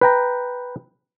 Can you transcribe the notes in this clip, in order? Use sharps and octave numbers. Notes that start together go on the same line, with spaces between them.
B4 G5 A#5